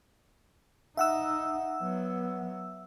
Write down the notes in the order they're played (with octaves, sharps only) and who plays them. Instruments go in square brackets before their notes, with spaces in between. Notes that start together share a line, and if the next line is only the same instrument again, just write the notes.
[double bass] D#4 [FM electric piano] E5 F#5 E6
[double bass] F#3 B3